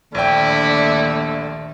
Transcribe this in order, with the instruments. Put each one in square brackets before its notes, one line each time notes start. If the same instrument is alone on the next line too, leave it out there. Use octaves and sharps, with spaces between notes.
[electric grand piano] A#1 G5 [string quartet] D#2 D3 A3 [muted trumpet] E4 [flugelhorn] D5